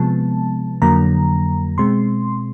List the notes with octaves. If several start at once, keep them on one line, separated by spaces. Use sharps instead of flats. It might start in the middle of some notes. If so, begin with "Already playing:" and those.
Already playing: C3 F3 G#3 B3 A5
F2 D3 F#3 A#3 A#5
B2 G#3 C4 C6